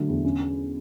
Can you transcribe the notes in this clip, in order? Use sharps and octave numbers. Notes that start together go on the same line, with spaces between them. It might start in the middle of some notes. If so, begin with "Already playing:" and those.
Already playing: D3 F#3 A3
E2
C#4